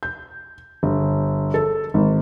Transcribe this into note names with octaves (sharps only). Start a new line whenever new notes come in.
G6
G1
A4
G#1